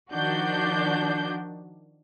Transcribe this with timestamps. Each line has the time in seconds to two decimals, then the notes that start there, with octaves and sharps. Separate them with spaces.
0.12 D#3 F3 D4 F#4 G6